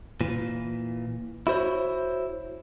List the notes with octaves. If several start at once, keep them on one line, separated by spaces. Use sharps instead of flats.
A#2 E3
E4 F#4 C5 C#5